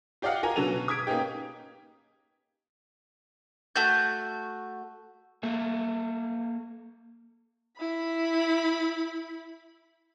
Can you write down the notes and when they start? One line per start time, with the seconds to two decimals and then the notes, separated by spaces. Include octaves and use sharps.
0.22 F4 G4 D5 D#5 F5 F#5
0.43 F4 A#4 G#5 A#5
0.56 B2 D3 F#3 A4 D#7 F7
0.73 B2
0.88 D#6 G#6 B6 D7
1.07 A#3 B3 C#4 D#4 G4
3.76 A3 F#4 G6
5.43 A#3 A4 E5
7.77 E4 B5